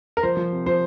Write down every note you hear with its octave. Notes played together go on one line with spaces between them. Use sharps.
A#4
F3 C5
F3
C3
F3 C5